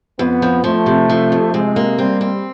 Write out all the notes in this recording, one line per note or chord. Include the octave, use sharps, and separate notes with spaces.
F2 B3
F3
F3 A3
C3
F3
F2
C3 G#3
A#3
G3 C4
C4